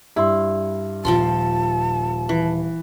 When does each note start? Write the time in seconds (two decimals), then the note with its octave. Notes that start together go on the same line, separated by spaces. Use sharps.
0.16 G2 E4 C6
1.05 D#1 F3 G5 A5 C6
2.29 E3